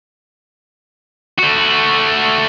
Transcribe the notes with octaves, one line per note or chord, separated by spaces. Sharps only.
A3 F#4